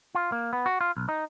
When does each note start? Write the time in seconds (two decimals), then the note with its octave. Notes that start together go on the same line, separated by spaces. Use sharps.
0.15 F4
0.32 A#3
0.53 B3
0.66 F#4
0.81 F4
0.97 B1
1.09 D#4